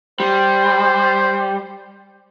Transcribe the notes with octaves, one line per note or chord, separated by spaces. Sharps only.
G3 C5